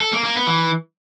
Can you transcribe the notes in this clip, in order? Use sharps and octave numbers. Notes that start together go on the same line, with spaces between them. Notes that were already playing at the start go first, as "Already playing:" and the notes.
A4
A#3
A#3
B3
E3